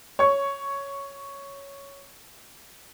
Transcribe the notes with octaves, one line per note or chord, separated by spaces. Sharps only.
C#5 C#6